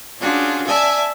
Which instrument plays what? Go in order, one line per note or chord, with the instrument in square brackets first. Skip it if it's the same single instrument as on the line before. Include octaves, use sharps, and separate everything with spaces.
[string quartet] C#4 D4 F4 F#4 G#4
D5 E5 G#5 A5